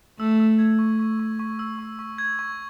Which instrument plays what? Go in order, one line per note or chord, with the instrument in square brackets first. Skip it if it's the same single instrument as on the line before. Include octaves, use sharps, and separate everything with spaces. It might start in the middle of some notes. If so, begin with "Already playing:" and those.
[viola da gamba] A3 [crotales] E6
[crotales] E6
G#6
C#6
C#6
C#6
C#6
E6
C#6
C#6
G#6
C#6